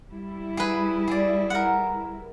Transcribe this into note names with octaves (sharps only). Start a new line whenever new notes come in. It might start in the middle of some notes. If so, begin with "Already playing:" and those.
G3 E4
G#4 B4
G#4 D5
A#4 F#5